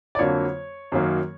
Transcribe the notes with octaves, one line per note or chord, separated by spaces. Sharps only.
D5
F2 D3 F#3 A#3 C#5
F#2 D#3 F#3 A#3